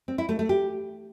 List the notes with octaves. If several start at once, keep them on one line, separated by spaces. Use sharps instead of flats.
C4
E4
A3
A3
G4